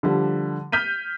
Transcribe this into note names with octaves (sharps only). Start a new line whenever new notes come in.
D3 F3 G3
F6 G6 B6 D#7